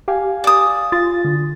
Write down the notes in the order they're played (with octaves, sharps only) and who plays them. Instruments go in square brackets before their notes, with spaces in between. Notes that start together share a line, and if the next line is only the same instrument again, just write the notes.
[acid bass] G4 [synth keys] F5 G#5
[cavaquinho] D5 D#6
[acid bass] F4 [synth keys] A6
[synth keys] D3